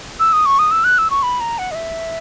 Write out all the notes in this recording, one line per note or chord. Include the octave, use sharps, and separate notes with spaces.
E6
D#6
C#6
D#6
E6
F#6
E6
C#6
B5
A#5
F#5
D#5
E5